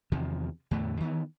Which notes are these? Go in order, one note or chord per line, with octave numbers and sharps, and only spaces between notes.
E2 C3 D#3 F3
E2 A2 D3 A3
D#3 E3 A#3 B3